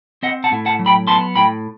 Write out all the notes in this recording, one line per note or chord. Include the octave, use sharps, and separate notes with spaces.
C4 D#5 F#5
F#5 A5
A2
F#5 A5
F#3
G5 B5
B3 A5 C6
A2 G5 B5